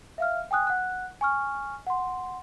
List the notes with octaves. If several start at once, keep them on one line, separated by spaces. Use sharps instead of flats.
E5 F5 F6
G5 G#5 D#6 F#6
F#5 F#6
G#5 C#6 F6
F#5 C6